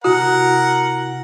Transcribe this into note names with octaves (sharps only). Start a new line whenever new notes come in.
C3 E4 F#4 A#4 F#5